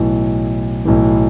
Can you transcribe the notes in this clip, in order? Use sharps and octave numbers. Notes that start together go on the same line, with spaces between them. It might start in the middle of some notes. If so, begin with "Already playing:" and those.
Already playing: B1 A2 E3
B1 A2 E3